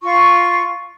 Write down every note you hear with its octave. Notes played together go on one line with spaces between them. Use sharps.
F4 C#6